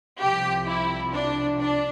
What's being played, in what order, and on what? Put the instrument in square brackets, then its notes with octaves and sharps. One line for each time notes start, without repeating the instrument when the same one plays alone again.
[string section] C2 C3 F3 G4
E4
D4
D4